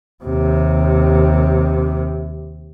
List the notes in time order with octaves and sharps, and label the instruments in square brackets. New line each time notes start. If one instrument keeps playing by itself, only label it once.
[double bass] D#2 C3